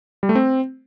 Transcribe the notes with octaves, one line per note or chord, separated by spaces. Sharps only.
G3
A3
C4